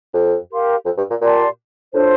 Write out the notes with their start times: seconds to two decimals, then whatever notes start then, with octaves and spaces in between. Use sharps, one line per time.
0.13 F2
0.50 G4 A#4 F5 C6
0.85 F2
0.97 G2
1.10 A#2
1.21 A#2 G4 D5 A5 C6
1.93 A2 D4 F4 A4 C5